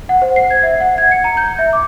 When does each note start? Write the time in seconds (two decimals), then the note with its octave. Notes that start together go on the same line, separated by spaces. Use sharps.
0.09 F#5
0.22 C5
0.36 C7
0.51 G#6
0.63 E5
0.80 F#5
0.98 G#6
1.11 C#7
1.24 A#5
1.37 G6
1.59 E5
1.73 D6